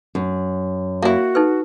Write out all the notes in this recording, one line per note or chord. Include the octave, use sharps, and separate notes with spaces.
F#2
A#3 E4 F#4
D#4 A4 B4